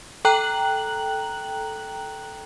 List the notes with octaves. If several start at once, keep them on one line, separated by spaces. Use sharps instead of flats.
A4 G5 A#5 F#6 F#7